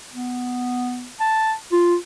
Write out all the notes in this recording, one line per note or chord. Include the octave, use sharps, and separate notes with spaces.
B3
A5
F4